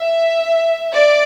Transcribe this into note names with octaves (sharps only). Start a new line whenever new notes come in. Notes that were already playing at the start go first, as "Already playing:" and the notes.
Already playing: E5
D5